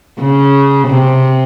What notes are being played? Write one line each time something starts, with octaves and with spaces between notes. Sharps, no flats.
C#3
C3